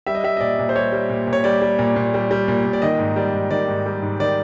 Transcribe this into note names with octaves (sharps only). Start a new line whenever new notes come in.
G3 E5
D#5
G3 E5
D#5
A#2 D5
A#2
C5
G3 C#5
G3
A#2
A#2
C#5
G3 D5
G3
A#2
A#2
G3
G3
A#2
A#2
D5
D#3 D#5
G#2
G3 D5
G#2
D#3 D5
G#2
G3
G#2
D#3 D5